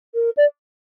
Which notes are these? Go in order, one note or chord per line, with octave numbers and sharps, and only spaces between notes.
A#4
D5